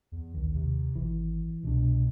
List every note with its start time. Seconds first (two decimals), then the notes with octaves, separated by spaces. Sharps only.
0.12 E2
0.35 A#1 D#2
0.55 C3
0.96 G#1 E3
1.64 C2 B2 D4